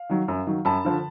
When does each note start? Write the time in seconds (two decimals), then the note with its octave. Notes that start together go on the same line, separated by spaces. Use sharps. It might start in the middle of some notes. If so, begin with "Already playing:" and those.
Already playing: F5
0.09 D#3 F#3
0.28 F#2
0.47 D#3 F#3
0.65 F#2 A5 B5
0.85 D3 F3